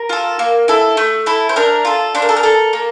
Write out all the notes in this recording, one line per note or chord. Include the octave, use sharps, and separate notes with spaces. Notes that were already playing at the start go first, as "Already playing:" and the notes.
Already playing: A#4
F4 A4
A#3
E4 A4
A3
E4 A4
C5
D4 A#4
F4 A4
D4 C5
A#4
A4
A#4
A4
A#3